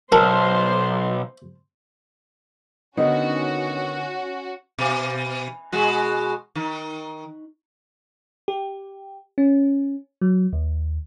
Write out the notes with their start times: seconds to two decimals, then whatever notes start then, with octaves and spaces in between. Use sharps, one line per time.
0.12 B1 A#4 C5 A5 C6
2.97 D3 D#3 B3 C#4 D#4 F#4
4.79 B2
5.72 B2 G#3 F#4
6.55 D#3
8.48 G4
9.38 C#4
10.21 F#3
10.53 D#2